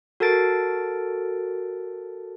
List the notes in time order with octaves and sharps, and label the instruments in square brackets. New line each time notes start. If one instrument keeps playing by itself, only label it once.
[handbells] F#4 A4 A#4 A5 A6 D7